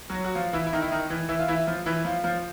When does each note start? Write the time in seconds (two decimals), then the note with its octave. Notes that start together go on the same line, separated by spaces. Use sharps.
0.10 F#3 F#4
0.25 F#4
0.35 F3 F4
0.53 E3 E4
0.67 E4
0.73 D#3 D#4
0.82 E4
0.91 D#3 D#4
1.10 E3 E4
1.29 E3 E4
1.39 F4
1.48 E3 E4
1.67 F3 F4
1.86 E3 E4
2.05 F3 F4
2.24 F3 F4